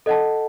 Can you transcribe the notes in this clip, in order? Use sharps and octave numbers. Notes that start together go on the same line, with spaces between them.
A4 D#5 F#5 A5